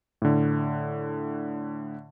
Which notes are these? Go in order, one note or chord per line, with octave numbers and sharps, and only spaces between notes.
A2 D3